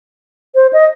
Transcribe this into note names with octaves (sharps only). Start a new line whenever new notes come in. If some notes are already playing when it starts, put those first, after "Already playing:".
C5
D#5